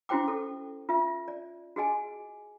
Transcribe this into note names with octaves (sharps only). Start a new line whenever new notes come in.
C#4 E4 F#4 C5 G5 D6
A4
F4 E5
D5
F#4 G#4 D#5 G#5